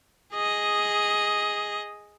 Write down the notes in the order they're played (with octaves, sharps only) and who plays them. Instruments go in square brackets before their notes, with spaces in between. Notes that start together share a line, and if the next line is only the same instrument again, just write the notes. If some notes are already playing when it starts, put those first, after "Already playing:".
[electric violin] G#4 D#5